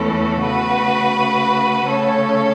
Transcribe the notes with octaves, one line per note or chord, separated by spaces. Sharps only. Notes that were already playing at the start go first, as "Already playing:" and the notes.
Already playing: E2 E3 A3 C#4 A4
C#3 A3 F#4 B4
C#3 A3 C#4 A4 C#5